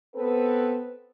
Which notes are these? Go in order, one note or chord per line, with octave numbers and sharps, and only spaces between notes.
B3 C4 A4 B4